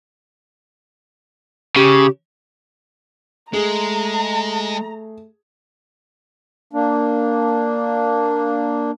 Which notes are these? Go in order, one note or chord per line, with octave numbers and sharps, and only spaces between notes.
C#3 G4
G#3 A3 G#4 A#5
A#3 D4